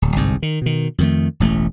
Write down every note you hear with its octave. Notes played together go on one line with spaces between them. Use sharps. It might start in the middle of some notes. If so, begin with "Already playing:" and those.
D1
G1 C2 G#2
D#3
B2 D#3
F2 D#3 A3
E1 A1 A3